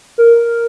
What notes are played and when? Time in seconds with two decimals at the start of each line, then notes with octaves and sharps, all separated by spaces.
0.18 A#4